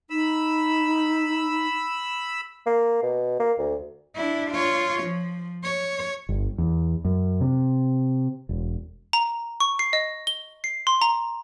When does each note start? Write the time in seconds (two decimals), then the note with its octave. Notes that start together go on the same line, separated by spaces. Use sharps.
0.10 D#4 B5 E6
2.66 A#3
3.03 B2
3.40 A#3
3.58 D2
4.15 D4 E4
4.51 F4 C#5
5.03 F3
5.64 C#5
6.29 G1
6.58 E2
7.05 F#2
7.41 C3
8.49 E1
9.13 A#5
9.60 C#6
9.79 C7
9.93 D#5
10.27 G7
10.64 C7
10.87 C6
11.02 A#5